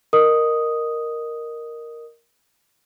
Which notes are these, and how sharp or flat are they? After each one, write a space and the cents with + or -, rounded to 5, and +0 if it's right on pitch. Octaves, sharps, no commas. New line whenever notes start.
A#4 +0 D#5 -15 D#6 +0